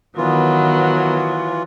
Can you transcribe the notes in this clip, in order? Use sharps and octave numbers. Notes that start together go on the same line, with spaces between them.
D#3 E3 F#3 B3 F4